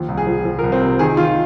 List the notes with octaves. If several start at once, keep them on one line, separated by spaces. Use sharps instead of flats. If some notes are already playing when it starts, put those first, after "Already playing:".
Already playing: D#2 F3
C2
G#4
F3
F3
A#4
C2
C4
C3
D#3 G#4
D#3 F4